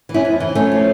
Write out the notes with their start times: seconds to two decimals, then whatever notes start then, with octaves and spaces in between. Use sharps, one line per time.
0.09 E3
0.14 C#4 E4
0.25 F2
0.40 E3
0.55 F3 A3 C#4
0.72 F3